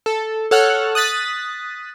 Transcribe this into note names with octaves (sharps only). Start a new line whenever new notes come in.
A4
A4 C#5 F#5 F6 F#6
D#6 F#6 A6 B6